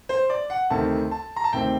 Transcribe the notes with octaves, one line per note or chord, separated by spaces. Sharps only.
C5
D5
F#5
D2 C3 D#3 A3 C4 A5
A5
A#5
A5
D2 C3 D#3 A3 C4 G5